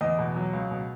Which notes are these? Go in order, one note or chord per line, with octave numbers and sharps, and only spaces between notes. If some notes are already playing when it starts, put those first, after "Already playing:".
E2 D#5
B2
F#3
C#2
B2